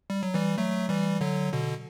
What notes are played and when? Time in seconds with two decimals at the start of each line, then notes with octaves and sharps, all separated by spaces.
0.10 G3
0.23 F#3
0.34 E3 G3
0.58 F#3 A3
0.89 E3 G3
1.21 D3 F#3
1.53 B2 D3